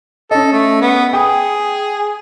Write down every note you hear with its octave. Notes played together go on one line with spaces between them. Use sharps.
C#4 A4 D#5
A3
B3
G#4 G5 D#6